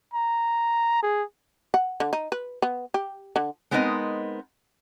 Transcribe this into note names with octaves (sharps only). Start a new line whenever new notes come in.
A#5
G#4
F#5
D3
D#4
B4
B3
G4
D3
G#3 B3 C4 D#4 A#4 D#5